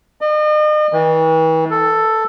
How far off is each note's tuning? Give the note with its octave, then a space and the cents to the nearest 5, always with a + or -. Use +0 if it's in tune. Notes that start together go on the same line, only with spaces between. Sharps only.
D#5 -40
E3 -40
A4 +5